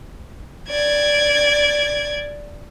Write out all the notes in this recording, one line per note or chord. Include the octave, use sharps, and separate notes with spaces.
D5 G#6